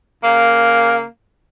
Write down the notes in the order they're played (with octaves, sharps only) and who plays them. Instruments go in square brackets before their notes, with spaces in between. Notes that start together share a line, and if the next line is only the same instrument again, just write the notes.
[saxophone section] C#3 A#3